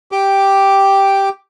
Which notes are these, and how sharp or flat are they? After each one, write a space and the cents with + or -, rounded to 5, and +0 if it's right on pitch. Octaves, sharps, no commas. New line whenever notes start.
G4 +0 G5 +0 D6 +0